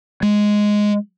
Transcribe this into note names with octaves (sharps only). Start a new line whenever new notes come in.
G#3